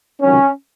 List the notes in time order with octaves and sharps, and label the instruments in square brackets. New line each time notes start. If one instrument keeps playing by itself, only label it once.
[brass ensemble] C#2 C3 D#3 F#3 C#4